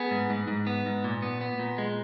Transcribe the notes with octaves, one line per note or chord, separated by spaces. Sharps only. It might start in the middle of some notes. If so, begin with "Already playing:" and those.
Already playing: B3 G#4
G#2
G#2
G#2
B3
G#2
A#2
B3
B3
A#2
G#3